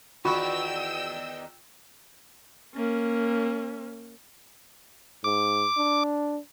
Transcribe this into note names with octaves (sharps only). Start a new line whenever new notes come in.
E2 D#3 F4 F#4 F#5 G5 C#6 E6
A#3 C#4
G#2 D6
D4